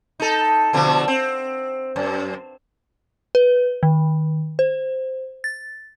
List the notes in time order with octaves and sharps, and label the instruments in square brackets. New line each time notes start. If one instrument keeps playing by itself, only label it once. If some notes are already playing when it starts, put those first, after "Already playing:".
[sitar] D#4 A4
B2 D3 F3
C4
F#2
[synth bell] B4
D#3
C5
A6